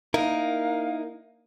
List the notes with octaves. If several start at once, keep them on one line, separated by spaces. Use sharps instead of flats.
A#3 D#4 E4 A#4 F5